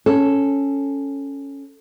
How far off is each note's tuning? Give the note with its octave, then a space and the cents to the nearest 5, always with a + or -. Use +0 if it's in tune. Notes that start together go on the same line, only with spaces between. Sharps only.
C#4 +0 A4 +0